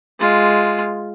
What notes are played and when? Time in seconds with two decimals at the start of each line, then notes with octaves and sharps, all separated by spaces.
0.20 G#3 F4